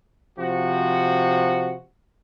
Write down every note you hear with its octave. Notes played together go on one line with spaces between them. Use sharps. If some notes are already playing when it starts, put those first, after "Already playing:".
C3 F3 F#4